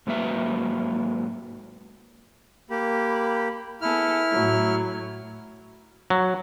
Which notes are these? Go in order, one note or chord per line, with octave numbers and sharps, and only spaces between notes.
G#2 F#3 A#3 B4 E5
A#3 G4 B5
B3 E4 G#4 A4 F6
A2 F#3
F#3